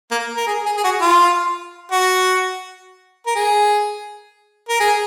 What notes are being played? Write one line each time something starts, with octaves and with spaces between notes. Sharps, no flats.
A#3
A#4
G#4
G#4
G#4
F#4
F4
F#4
A#4
G#4
A#4
G#4